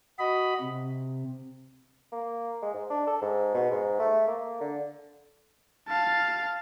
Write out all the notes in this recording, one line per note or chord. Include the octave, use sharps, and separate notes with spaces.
F#4 D#5 B5
C3
A#3
G#3
G#2
D4
A4
G#2
B2
G#2
A3
A#3
D3
F5 A5